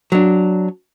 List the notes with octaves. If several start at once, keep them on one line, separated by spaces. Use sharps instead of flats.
F#3 D4